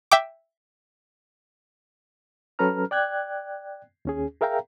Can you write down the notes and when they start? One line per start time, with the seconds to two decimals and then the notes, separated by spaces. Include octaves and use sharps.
0.11 E5 G5 D6
2.59 F#3 C#4 A4 B4 A#5 F6
2.91 D5 G5 F#6 G#6
4.05 D#2 C#4 G#4
4.41 G#4 A#4 E5 F5 G5 A#5